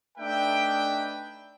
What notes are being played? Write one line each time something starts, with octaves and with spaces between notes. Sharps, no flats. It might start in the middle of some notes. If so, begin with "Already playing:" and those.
A3 D4 D#4 B4 E5 G5